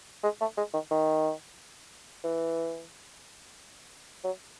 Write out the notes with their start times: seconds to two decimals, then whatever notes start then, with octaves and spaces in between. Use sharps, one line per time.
0.23 G#3
0.41 A3
0.57 G#3
0.74 D#3
0.91 D#3
2.24 E3
4.24 F#3